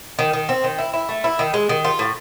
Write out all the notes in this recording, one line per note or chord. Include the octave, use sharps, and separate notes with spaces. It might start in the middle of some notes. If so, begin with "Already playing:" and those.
D#3
D#3
C4
D#3
E4
E4
A3
E4
D#3
G#3
D#3
F4
A2